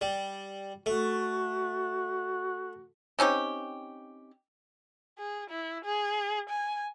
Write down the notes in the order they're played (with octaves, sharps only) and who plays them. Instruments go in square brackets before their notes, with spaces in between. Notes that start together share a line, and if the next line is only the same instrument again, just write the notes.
[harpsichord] G3
[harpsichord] A3 [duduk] F#4
[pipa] C4 C#4 D#4 G4
[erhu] G#4
E4
G#4
G#5